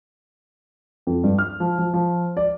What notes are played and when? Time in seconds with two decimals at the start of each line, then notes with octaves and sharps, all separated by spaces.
1.07 F2
1.24 G2
1.38 F6
1.60 F3
1.79 F3
1.93 F3
2.37 D5